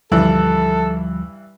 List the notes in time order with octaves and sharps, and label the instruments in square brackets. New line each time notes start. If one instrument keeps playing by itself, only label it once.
[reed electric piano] D2 F3 G3 [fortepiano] G2 E3 [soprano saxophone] A4